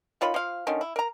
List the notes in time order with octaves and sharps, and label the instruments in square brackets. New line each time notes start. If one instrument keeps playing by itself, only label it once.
[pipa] D#3 F4 C#5 B5
F3 F5
D3 D#3 C#4
E4
A#4 A#5